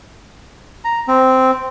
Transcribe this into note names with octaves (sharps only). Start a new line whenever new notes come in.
A#5
C4